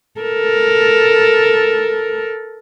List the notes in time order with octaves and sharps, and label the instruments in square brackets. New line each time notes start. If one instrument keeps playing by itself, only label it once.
[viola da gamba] A4 A#4